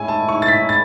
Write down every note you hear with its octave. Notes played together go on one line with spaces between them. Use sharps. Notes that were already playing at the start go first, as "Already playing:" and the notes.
Already playing: A2 G#3 C#4 E4 G#5
A5
C#6
A6
B6
A6